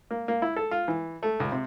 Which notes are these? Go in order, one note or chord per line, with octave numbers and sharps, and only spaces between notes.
A#3
A#3
E4
A4
F4
E3
A3
C#2
C3